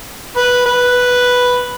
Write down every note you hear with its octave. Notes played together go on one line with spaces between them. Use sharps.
B4
B4